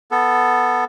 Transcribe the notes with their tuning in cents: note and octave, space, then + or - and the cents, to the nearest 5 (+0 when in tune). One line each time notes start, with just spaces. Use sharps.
B3 +0 A4 +0